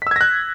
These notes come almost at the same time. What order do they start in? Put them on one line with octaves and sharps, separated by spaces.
B6 E6 G#6 A#6 F#6